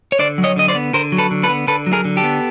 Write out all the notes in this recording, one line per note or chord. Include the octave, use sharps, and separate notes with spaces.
C#5
D3 C5 D5
F#3
C#5 D#5
D3 D#5
C5 D5
B3
D3 A#4 C5
F#3
A4 B4
D3
A4 B4
B3
D3 A4 B4
F#3
G#4 A#4
D3
G4 A4
B3